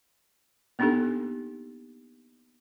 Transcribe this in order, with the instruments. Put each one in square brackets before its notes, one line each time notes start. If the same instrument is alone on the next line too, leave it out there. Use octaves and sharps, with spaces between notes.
[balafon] A#3 B3 D4 D#4 G4 A4